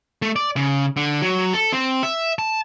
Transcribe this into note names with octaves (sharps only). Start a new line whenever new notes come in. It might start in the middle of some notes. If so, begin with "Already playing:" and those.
A3
D5
C#3
D3
F#3
A4
C4
E5
A5